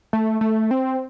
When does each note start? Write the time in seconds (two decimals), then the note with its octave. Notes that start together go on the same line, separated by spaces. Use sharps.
0.13 A3
0.41 A3
0.71 C4